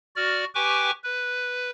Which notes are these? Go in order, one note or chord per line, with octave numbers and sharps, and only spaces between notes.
F#4 D5 F6
G4 B4 G5 G#5 C#6 D6
B4